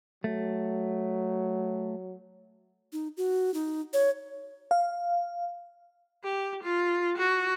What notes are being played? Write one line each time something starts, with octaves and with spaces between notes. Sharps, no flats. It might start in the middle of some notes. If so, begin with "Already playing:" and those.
F#3 A3
D#4
F#4
D#4
C#5
F5
G4
F4
F#4